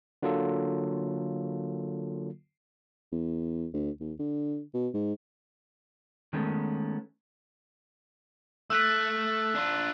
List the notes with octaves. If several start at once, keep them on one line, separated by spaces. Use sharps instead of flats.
D3 F#3 A#3 F4 A4
E2
D2
D#2
D3
B2
G#2
D#3 G#3 A3 B3 C#4
A3 E6 F#6 B6
D4 F4